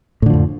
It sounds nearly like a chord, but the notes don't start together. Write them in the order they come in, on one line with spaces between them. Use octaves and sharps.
A2 D3 F3 F2